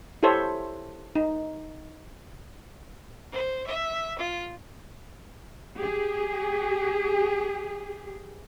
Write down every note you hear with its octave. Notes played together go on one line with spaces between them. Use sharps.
E4 G4 A4 C5 C#5 E5
D#4
C5
E5
F4
G4 G#4